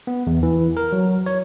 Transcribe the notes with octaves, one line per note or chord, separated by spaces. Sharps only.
B3
E2
E3
A#4
F#3
C#5